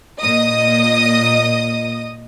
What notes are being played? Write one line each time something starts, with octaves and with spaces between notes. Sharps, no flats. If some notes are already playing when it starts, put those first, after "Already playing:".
A#2 D#5 D#6